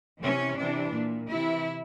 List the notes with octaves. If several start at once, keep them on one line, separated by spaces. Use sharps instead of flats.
C3 E3 C#4
C3 E3 D4
A#2
C3 E3 E4